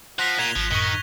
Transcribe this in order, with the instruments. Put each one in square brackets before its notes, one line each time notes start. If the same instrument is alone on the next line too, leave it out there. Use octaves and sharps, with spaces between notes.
[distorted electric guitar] F3 [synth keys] F#5 [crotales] F#6 A#6 B6
[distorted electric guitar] A#2 [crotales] G#6 F7 G7
[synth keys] G#1 [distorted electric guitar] F3
[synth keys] F#2 A2 C#7 [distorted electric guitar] D#3 [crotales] C#6 G7